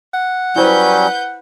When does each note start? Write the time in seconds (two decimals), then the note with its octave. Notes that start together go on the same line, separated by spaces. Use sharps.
0.14 F#5
0.56 F#3 G3 C#4 E4 B4 C5 G#5 G6